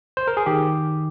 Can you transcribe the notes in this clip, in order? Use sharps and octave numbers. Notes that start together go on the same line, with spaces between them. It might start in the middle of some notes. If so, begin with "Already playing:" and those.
C5
A#4
G#4
D#3 G4